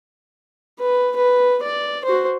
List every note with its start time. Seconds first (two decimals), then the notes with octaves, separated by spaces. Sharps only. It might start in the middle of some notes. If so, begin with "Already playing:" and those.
0.79 B4
1.16 B4
1.63 D5
2.05 F#4 C5